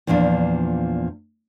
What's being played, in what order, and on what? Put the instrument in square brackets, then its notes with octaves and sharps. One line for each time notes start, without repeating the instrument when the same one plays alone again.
[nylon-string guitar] E2 A#2 F3 D4